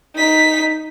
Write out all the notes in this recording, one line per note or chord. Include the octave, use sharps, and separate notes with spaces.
D#4 B6